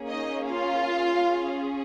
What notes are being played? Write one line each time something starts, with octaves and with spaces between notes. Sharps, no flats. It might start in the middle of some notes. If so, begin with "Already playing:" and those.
Already playing: A#3 C#4 G#4
D#4 D#5
F4 F5
C#4 G#4